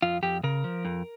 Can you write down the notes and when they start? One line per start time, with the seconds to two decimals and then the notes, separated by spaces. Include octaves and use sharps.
0.02 F2 F4
0.23 F2 G4
0.43 C#3 A#4
0.64 F3
0.85 F2